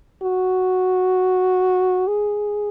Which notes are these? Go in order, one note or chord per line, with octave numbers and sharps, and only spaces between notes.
F#4
G#4